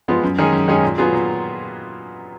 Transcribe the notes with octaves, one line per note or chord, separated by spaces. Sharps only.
F3 G#3 B3 F4
F#2
D#3 G#3 C#4 G#4
F#2
D#3 G#3 C#4 G#4
A#2
F#3 B3 F4 G#4
A#2